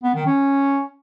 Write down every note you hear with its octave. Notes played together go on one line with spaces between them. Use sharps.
B3
D#3
C#4